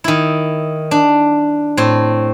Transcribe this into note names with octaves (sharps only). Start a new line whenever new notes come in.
D#3 E4
D4
A2 C4